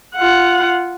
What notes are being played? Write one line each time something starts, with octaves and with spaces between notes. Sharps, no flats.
F4 F#5